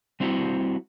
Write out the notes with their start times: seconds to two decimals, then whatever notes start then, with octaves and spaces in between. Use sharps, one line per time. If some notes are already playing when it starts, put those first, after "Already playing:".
0.20 G3 C4 E4 F#4